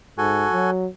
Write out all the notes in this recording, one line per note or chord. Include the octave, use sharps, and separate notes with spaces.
G#2 F#4 A4 G#5
F#3